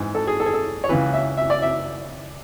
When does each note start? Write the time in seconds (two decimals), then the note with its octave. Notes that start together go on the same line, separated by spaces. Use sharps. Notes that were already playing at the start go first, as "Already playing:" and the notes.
Already playing: G#2 E3
0.15 A4
0.27 G#4
0.40 A4
0.46 G#4
0.54 A4
0.84 C#5
0.89 C#2 C#3 E3 B4
1.13 E5
1.37 E5
1.50 D5
1.62 E5